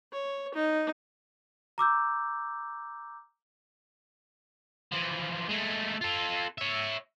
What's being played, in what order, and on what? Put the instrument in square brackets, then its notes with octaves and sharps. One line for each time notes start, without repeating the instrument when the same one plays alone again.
[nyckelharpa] C#5
D#4
[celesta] A#5 D6 E6 G6
[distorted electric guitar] E3 F3
G#3 A3
F4 A4
C#5 E5